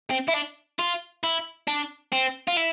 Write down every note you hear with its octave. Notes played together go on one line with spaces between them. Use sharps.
C4
E4
D4
F4
E4
D4
C4
F4
E4